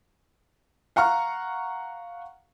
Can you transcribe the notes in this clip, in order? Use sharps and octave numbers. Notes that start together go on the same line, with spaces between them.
F5 F#5 A#5 C#6 F6